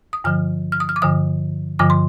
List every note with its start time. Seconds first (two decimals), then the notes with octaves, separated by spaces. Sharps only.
0.13 D#6
0.24 G2 D3 F3 F6
0.72 F6
0.80 D#6
0.89 F6
0.96 D6
1.02 G2 D3 F3 D#6
1.79 G2 D3 F3 D6
1.90 C6